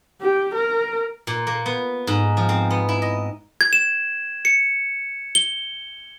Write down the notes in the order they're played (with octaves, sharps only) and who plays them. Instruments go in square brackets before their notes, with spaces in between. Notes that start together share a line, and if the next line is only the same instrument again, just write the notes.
[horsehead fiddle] G4
A#4
[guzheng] A#2
A#3
B3
G#2
F3
C4
B3
E4
D#5
[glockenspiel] G#6
E7
C#7
G7